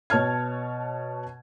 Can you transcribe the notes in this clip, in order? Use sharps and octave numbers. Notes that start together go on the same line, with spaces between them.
B2 C#5 A5 F6 G#6